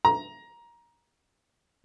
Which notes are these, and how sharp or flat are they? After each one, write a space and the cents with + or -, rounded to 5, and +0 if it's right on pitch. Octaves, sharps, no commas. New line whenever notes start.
A#5 +15